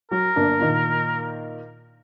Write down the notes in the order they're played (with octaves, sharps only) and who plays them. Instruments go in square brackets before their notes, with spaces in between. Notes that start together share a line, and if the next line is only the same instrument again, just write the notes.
[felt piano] F#3 [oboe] A#4
[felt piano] G1 A#3 D4
A#2 D#3